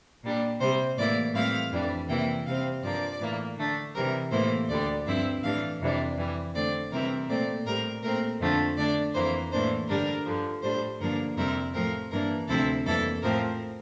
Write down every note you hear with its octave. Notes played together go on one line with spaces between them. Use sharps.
A#2 G3 D4
C3 G3 C4 C5
A2 E3 A#3 E4 D5
A2 E3 G3 C4 E4 F5
F2 E3 G3 D4
C3 E3 A#3 E4 G5
C3 G3 C4 F5
G2 F3 A#3 D5
A2 E3 A#3
D3 A3 D4
C3 E3 G3 C4 A#4
A2 E3 A#3 E4 C5
D2 D3 G3 D5
G2 F3 C4 E4 E5
A2 E3 G3 D4 F5
F2 C3 E3 G3 D4
F2 E3 G3
D3 A3 C4 D5
C3 E3 G3 C4 E4 A#4
A#2 A3 C4 D5
A2 G3 C4 A#4
A#2 A3 C4 A#4
F2 D3 F3 A3 C4
D3 A3 D4 D5
F2 E3 A#3 C5
A2 E3 A#3 D4 C5
G2 D3 G3 D4 A#4
G2 D3 F3
A2 G3 D4 C5
G2 D3 F3 A#3 D4 A#4
F2 C3 G3 C4 E4 A#4
A2 F3 A3 C4 A#4
G2 E3 A#3 D4 A#4
D2 C3 F3 C4 E4 A4
F2 E3 G3 A#3 E4 A4
A2 F3 C4 A#4